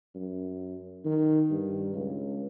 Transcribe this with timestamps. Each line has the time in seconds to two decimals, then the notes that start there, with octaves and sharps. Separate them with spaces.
0.15 F#2
1.05 D#3
1.50 G2
1.94 C#2